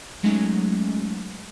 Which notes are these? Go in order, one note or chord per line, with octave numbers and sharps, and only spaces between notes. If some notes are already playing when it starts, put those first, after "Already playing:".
F#3 G#3 A3 C#4 D#4